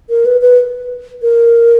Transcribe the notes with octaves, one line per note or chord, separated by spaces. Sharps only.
A#4
B4
B4
A#4